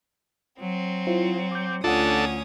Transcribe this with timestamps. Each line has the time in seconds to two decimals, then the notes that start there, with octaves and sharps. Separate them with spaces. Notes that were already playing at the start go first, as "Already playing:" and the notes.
0.59 F#3 C4
1.07 E4 F4 C5
1.52 D6 G6
1.84 D2 C#4 D4 F4 A4 F#5 D#6